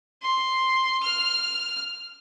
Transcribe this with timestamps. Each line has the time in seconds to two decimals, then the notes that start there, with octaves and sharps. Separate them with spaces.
0.22 C6
1.03 F6